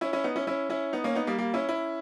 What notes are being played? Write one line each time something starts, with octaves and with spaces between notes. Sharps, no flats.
C#4 E4
C#4 E4
B3 D#4
C#4 E4
C#4 E4
C#4 E4
B3 D#4
A#3 C#4
B3 D#4
G3 A#3
G3 A#3
C#4 E4
C#4 E4